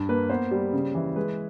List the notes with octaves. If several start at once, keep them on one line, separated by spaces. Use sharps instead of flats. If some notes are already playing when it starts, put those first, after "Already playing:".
Already playing: G2
A#3 B4
B3 C5
G3
C#3
E3
G#3 B4